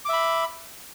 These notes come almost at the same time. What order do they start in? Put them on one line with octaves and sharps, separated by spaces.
D6 E5 B5